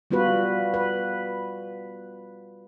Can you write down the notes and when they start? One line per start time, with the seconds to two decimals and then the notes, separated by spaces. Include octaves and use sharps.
0.11 G3 B3 F4 F#4 B4
0.74 B4